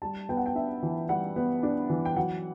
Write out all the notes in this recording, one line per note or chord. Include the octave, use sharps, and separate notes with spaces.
G3 A5
B3 G5
F#5
G5
D4 E5
E3
G3 F#5
B3
D4
E3
G5
F#3 F#5